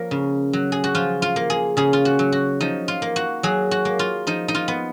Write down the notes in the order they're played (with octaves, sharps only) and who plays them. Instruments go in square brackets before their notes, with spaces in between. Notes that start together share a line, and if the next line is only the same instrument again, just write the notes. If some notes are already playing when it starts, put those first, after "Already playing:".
Already playing: [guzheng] F3 A#3 A#4 C#5
C#3
F#3
G#4
F#4
F3 F4
F4
A#3
G#4
C#3 G#4
F4
F#4
F#3
F#4
F3 D#4
F4
A#3
F#4
F#3 G#4
F#4
A#3
F4
F3 D#4
D#4
F4
B3